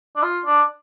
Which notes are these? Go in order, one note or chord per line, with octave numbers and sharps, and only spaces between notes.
D4
F4
D4